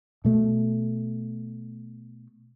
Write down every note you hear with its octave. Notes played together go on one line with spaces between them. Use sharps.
B2 A3